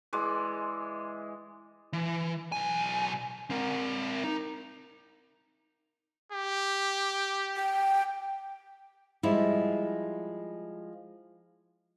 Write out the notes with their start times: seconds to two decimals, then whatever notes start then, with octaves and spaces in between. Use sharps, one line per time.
0.13 E3 G#3 D5
1.93 E3
2.52 B1 G#5
3.50 C4 A#4
4.24 D#4
6.32 G4
7.57 G5
9.23 F3 G3 G#3 E4